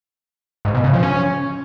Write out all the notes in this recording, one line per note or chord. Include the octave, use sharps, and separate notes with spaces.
G#2
B2
C#3
F3
C#4